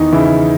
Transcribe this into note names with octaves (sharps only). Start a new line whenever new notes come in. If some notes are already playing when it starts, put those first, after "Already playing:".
Already playing: E2 D#3 D#4
C#3 E3 E4